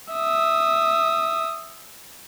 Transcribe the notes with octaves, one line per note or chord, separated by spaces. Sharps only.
E5 D#6